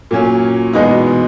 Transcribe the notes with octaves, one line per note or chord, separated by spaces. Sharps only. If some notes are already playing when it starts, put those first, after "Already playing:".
A#2 F#3 C#4
E2 B2 G#3 B3 D#4